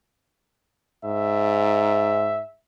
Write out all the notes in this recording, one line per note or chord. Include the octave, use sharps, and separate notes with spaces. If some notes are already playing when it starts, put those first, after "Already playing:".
G#2 E5